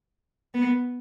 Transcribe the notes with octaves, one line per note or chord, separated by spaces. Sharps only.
B3